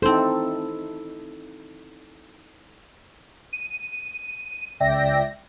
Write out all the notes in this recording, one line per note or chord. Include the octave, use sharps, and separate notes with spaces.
C4 D#4 E4 A4 C5
D#7
C#2 D5 E5 G5 A#6